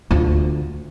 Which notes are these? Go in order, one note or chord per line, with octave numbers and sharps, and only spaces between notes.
D2 F4